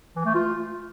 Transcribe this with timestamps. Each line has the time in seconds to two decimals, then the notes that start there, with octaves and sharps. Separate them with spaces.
0.16 E3
0.25 A3
0.35 F4